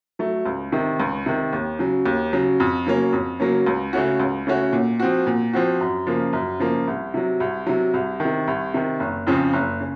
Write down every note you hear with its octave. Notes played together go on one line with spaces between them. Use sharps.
F#3 A3
C#2
C3 D#3
C#2
C3 D#3
D#2
C#3 F#3
D#2
C#3 F#3
F2
C#3 F#3 A#3 C#4
F2
C#3 F#3 A#3 C#4
C#2
C#3 A3 C#4 F#4
C#2
C#3 A3 C#4 F#4
A#2
F3 C4 F#4
A#2
F3 C4 F#4
F#2
C#3 F3 A#3
F#2
C#3 F3 A#3
C2
C3 F#3
C2
C3 F#3
C2
C3 D#3
C2
C3 D#3
F#1
F2 C#3 F3 C4
F#1
C#3